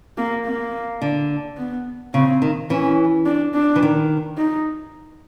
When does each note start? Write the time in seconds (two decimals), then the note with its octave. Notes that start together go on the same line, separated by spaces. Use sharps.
0.18 A#3
0.45 A#3
1.02 D3
1.57 B3
2.14 C#3 C4
2.42 D#3
2.70 E3 C#4
3.26 D4
3.55 D4
3.76 E3
3.83 D#3
4.38 D#4